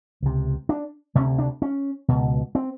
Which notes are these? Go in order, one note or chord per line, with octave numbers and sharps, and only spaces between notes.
C#2 C3
D4
D2 C3 C#4
D4
C#4
C#2 B2
C4